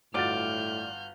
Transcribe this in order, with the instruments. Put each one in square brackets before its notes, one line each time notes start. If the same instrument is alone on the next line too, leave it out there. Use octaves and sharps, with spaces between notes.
[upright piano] G1 F#4 A6 [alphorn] A2 [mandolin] F4 D5 [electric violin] F6 G6